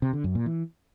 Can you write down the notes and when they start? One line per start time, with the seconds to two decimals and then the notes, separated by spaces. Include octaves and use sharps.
0.02 C3
0.13 D3
0.24 F#2
0.35 A#2
0.46 E3